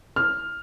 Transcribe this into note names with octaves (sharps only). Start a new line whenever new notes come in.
F6